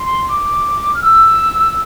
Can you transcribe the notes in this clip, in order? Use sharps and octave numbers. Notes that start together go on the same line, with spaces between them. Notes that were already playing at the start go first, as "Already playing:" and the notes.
Already playing: C6
D6
F6
E6